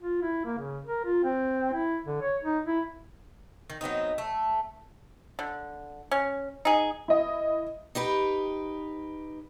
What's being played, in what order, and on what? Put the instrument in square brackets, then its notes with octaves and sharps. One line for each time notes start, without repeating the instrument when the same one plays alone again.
[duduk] F4
E4
A#3
C#3
A#4
F4
C4
E4
D3
C#5
D#4
E4
[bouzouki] D#3
F#3 B3 C4 D#4
A3
[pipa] D3
C#4
D#4 G#4
[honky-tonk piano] E4 D#5
[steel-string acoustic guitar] D#4 G4 B4